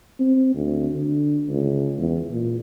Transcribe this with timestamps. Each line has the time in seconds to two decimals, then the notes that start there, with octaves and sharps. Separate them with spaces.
0.19 C4
0.54 D2
0.94 D3
1.48 C#2
1.98 E2
2.30 A#2